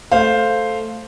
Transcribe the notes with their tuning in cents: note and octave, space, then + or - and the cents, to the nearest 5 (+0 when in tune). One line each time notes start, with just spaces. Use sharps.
A3 +0 C5 +0 F5 +0